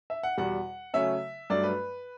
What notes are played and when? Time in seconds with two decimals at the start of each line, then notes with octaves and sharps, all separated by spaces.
0.10 E5
0.23 F#5
0.38 E2 B2 G3 F#5
0.94 C#3 F#3 A3 C#4 E5
1.50 G2 F#3 A3 D4 D5
1.63 B4